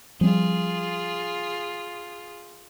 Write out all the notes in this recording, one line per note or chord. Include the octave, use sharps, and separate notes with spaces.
F3 G3 C4 F4 G#4